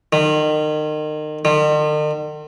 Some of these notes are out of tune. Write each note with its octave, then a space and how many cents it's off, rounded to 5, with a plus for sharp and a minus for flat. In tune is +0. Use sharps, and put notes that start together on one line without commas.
D#3 -30
D#3 -45